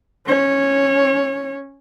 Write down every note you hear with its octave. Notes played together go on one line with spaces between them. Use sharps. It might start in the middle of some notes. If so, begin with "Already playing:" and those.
C#4 C#5